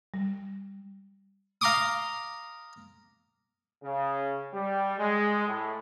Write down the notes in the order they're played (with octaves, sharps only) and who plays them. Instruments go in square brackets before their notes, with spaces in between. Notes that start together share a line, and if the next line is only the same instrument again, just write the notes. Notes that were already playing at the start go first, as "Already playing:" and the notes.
[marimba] G3
[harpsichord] F5 A#5 C6 D6 D#6
[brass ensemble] C#3
G3
G#3
A2